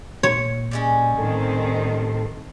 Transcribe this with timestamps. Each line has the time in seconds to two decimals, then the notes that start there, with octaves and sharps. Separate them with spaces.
0.23 A#2 C#5
0.71 G3 G#3 C#4
1.18 A2 D#3 C4 A4